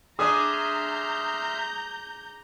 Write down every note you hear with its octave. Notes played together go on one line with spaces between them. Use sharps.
D4 G#4 E5 A#5 C6 D#6 F6 G6